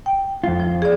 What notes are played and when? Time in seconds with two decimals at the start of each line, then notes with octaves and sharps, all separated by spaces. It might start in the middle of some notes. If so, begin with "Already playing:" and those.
0.06 G5
0.44 F2 F4
0.60 F3
0.82 G#4 D5